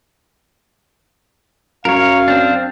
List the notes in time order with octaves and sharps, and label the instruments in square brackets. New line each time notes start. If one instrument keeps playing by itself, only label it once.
[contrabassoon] F#2 [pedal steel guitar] A#4 C#5 [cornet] F5
[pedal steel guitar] C4 D4